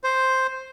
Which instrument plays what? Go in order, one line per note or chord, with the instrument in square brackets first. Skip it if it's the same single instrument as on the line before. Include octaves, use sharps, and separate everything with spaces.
[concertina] C5